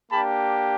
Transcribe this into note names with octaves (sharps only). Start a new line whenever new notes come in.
A#3 D4 G4 A5 B5